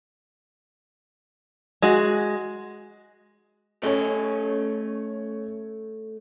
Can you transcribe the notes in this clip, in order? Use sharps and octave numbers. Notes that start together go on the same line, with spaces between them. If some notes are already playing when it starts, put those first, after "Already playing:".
G#3 F#4
A3 C#4 A4 C#5 D#5